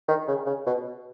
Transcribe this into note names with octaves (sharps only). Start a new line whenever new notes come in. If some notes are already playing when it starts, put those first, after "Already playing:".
D#3
C#3
C#3
B2